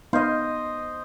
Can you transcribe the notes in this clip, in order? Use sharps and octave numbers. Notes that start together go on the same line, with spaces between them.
B3 D#4 C5 D#5 F5